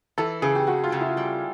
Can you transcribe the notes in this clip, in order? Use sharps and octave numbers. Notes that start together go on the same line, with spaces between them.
E3 A4
C#3 G#4
G4
F2 F#4
F4
C#3
E4
G3